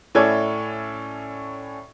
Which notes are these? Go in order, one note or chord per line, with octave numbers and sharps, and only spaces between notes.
A2 C#4 E4 A4 D5 G#6